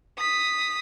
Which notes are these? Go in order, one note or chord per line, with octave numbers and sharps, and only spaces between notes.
D#6 B6